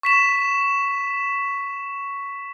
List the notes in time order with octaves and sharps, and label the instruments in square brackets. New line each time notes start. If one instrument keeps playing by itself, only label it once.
[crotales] C#6 B6 E7